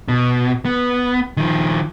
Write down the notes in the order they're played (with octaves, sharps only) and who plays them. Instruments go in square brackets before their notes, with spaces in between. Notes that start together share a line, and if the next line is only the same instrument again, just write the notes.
[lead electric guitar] B2
B3
D#3 F3